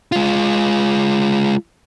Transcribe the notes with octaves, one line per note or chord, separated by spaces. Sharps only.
G#3 F4